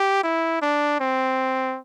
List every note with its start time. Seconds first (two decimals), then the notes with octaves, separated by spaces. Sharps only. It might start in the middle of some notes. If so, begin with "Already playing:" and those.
Already playing: G4
0.24 E4
0.62 D4
1.00 C4